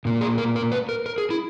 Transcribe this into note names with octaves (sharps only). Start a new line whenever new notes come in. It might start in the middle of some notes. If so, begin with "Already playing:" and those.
A#2 A#3
G#4
A#4
A#4
B4
A#4
A#4
G#4
E4